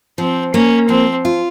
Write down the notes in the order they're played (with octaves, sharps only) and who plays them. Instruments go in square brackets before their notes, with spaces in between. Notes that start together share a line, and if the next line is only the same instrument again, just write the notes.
[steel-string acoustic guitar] F3 [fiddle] C4
[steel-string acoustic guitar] A#3 [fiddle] C#4
[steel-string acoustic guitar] F3 [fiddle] C4
[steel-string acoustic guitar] F4